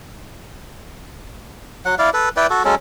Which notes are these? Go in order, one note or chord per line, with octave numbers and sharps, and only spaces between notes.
F#3 F#5
E4 D5 F5
A4 B4
E4 B4 D5 G5
F#4 A4
F#3 G#3 C#4 A4